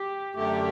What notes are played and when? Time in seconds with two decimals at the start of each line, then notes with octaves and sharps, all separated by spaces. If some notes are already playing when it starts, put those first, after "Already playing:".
Already playing: G4
0.35 F#2 D3 A3 G4